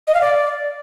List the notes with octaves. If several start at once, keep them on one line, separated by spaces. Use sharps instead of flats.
D#5
F5
D5